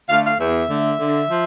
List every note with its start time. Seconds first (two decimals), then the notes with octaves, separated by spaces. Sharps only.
0.09 D3 A3 F5
0.24 F5
0.39 E2 E5
0.70 D3 A3
1.00 D3
1.31 F3